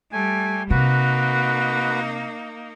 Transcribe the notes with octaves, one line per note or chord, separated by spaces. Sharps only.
G3 A3 G#5
C3 A#3 D#4 F#4 B4